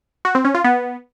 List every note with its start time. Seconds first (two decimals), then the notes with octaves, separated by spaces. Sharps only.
0.25 F#4
0.35 C4
0.45 C#4
0.54 F4
0.64 B3